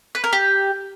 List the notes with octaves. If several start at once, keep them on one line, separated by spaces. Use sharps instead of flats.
B4
A#4
G4